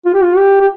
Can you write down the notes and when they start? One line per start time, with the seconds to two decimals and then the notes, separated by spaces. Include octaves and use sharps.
0.05 F4
0.14 G4
0.23 F4
0.37 G4
0.61 G4